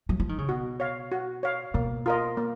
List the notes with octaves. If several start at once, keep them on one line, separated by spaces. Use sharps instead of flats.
F#3
F3
D#3
C#3
B2 F#4
C#5 F5
F#4
C#5 F5
B2 A#3
F4 A#4 D#5
A#3